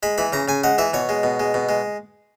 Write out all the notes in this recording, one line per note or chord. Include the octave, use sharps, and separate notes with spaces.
G#3 B5
E3 B5
C#3 A#5
C#3 G#5
G#3 F#5
E3 E5
B2 C#5
G#3
B2
G#3
B2
G#3